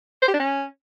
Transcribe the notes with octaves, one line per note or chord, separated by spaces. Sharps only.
C5
G4
D4
C#4